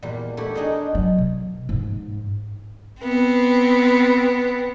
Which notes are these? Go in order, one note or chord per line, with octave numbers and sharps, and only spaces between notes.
E2 A#2 G3
A3 E4 F#4 G4
D4 D#4 F#4 G#4 A#4
F#3
B2
G#2
B3 C4